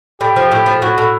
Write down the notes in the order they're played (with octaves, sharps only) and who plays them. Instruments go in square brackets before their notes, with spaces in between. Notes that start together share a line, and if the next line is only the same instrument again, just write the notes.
[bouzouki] A2 [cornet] G4
[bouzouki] F3
A2
F3
[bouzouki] A2 [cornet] F#4
[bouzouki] A2